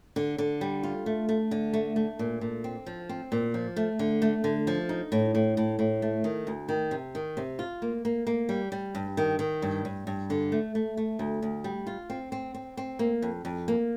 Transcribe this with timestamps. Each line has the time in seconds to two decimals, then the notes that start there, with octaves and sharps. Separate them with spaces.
0.16 D3
0.38 D3
0.61 G3
0.83 F4
1.06 A3
1.29 A3
1.51 D3
1.73 A3
1.96 A3
2.19 A#2
2.41 A#2
2.64 C4
2.86 F3
3.09 C4
3.32 A#2
3.54 F3
3.76 A3
3.99 D3
4.22 A3
4.44 D3
4.67 F3
4.89 D#4
5.12 A2
5.35 A2
5.57 A2
5.79 A2
6.02 A3
6.24 D#3
6.47 D2
6.69 D#3
6.91 C3
7.15 D#3
7.37 C3
7.59 F4
7.82 A#3
8.05 A#3
8.27 A#3
8.49 G3
8.72 G3
8.95 G2
9.17 D#3
9.39 D#3
9.62 G2
9.85 G2
10.07 G2
10.30 D3
10.52 A3
10.75 A3
10.97 A3
11.19 D2
11.42 D2
11.64 G3
11.87 F4
12.10 C4
12.32 C4
12.54 C4
12.77 C4
12.99 A#3
13.22 F2
13.45 F2
13.68 A#3